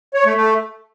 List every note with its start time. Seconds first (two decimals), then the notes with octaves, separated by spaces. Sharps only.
0.14 C#5
0.25 A3
0.36 A3